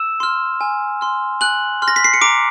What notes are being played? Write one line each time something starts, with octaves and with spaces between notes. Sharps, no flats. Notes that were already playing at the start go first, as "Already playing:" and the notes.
Already playing: E6 E7
C6 F6
G#5
C6 F6
G#5 F#6 F#7
C6 F6
A#6
B6
C7
C#7
A#5 D6 D7